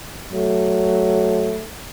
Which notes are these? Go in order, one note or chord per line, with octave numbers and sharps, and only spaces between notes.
F#3 A3